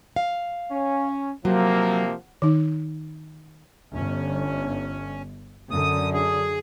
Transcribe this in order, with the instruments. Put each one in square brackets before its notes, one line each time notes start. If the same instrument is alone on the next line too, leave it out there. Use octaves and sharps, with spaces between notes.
[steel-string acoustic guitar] F5
[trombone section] C#4
[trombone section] C3 F3 A#3 [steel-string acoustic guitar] F#3
[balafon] D#3 D#4
[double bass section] G1 [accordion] C#4
[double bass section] F#2 D3 [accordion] D#6
[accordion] G#4